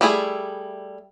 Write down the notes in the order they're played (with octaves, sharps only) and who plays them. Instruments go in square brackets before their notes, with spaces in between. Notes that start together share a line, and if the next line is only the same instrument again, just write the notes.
[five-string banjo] G3 A3 E4 G#4